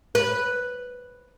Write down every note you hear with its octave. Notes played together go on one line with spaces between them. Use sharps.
B4